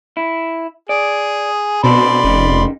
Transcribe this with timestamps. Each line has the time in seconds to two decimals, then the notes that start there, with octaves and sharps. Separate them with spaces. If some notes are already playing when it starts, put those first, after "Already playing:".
0.17 E4
0.89 G#4 D5
1.84 B2 C4 D4 A4 D5 B5 C6
2.24 F1 C#3 D#4